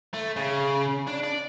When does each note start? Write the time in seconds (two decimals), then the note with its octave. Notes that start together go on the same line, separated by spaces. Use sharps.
0.14 A3
0.36 C#3
1.07 D4
1.23 D5